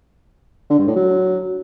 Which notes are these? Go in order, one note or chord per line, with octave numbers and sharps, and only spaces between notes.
D3
G2
A2
F#3